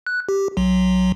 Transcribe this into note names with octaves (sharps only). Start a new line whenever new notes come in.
F#6
G4
B1 F#3